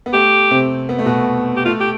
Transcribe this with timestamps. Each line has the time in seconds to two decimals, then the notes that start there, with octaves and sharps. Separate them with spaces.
0.06 B3
0.13 A3 G4
0.51 C3 C4
0.89 B3
0.99 A3
1.06 B2 B3
1.56 G4
1.65 A3 F4
1.81 G4